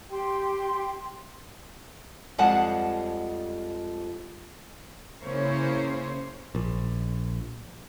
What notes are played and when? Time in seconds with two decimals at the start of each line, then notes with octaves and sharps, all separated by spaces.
0.11 G4 G5 C6
2.38 F2 F3 G3 G#3 F#5 A5
5.21 C#3 A#3 C#4 E4 C5 C#5
6.55 A#1